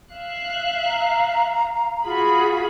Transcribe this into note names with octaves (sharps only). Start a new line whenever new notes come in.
E5 F5 F#6
A#5
F4 F#4 G#4 B5